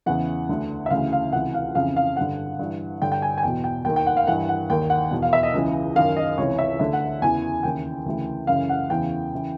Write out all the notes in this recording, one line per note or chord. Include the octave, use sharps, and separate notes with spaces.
E2 C#3 E3 F#5
D2 D3
E5
D2 C#3 E3 F5
F5
C#2 C3 E3 F#5
F5
F2 C#3 E3 F5
F5
G2 D3 F#5
G2 E3
G2 D3 G5
G5
G#5
G#5
E2 B2 G5
G5
D#2 D#3 G5
G5
F#5
F5
G2 E3 F#5
F#5
D#2 D#3 G5
F#5
E2 B2
F5
E5
D#5
C#2 C#3 E3
F#2 D#3 F5
D#5
C#2 C3 E3 C#5
E5
D2 D3 E5
F#5
E2 C#3 E3 G#5
D#2 C#3 E3 G5
D2 C#3 E3
F#2 C#3 E3 F5
F#5
E2 C#3 E3 G5
C#3 E3